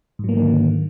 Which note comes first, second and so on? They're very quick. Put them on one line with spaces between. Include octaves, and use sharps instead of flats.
G#2 F#3 A#3 D#3 D3